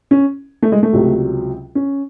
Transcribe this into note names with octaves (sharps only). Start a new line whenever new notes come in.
C#4
A3
G#3
A3
C#2 C3 F#3
C#4